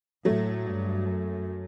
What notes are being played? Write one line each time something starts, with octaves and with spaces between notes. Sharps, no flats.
A2 F#3 A3
G2
F#2